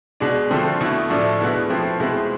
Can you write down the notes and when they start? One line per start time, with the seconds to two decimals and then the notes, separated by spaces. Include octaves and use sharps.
0.20 B2 G#3 D4
0.50 D3 F3 A3 C4
0.81 B2 A3 E4
1.10 A2 F3 A3 D4
1.40 B2 G#3 B3 E4
1.70 F3 A3 C4 E4
2.00 B2 G#3 C4 E4